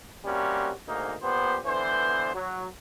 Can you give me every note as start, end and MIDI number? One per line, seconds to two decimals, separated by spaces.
0.25 0.71 48
0.25 0.71 55
0.25 0.71 58
0.25 0.71 61
0.25 0.71 66
0.86 1.14 38
0.86 1.14 44
0.86 1.14 58
0.86 1.14 63
1.22 1.57 46
1.22 1.57 59
1.22 1.57 67
1.22 1.57 72
1.65 2.33 50
1.65 2.33 52
1.65 2.33 59
1.65 2.33 72
2.34 2.65 54